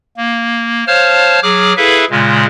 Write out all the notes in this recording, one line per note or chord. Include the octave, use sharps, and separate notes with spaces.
A#3
C5 C#5 F5 A5 F6
F#3 G#4 D6 F6
E4 G#4 A4 B4 E5 F5
A#2 C#3 G#3